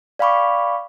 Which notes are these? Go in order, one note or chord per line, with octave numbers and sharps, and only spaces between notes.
D5 F5 G5 B5 C#6 D6